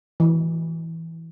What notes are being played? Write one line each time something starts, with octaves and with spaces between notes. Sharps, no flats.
E3